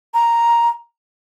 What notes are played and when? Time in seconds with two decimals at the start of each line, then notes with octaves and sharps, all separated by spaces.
0.14 A#5